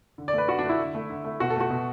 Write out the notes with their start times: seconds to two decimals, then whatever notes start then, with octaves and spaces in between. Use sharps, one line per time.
0.18 D3
0.28 D5
0.33 A3 B4
0.48 D3 F#4
0.59 A3 D4
0.69 E4
0.79 D3
0.95 A3
1.10 D3
1.25 A3
1.40 B2 F#4
1.50 A4
1.56 A3 F#4
1.70 B2